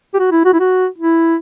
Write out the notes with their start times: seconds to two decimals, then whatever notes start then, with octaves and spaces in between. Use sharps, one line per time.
0.14 G4
0.19 F#4
0.31 E4
0.45 F#4
0.53 E4
0.60 F#4
0.98 E4